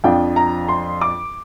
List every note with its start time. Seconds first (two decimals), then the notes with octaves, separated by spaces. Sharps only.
0.04 F2 F3 D4 F4 G5
0.36 A#5
0.68 C6
1.01 D6